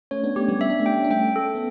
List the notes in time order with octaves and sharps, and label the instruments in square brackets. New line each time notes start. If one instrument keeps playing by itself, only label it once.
[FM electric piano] A3 C#4 [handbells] C#5
[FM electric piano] B3 D4
[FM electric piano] A3 C#4 [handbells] G4
[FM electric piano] G3 B3
[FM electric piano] C#4 [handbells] E5
[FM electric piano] D4
A3 C#4
[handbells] G5
[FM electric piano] D4
[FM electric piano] A3 C#4 [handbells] G5
[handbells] A4
[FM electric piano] B3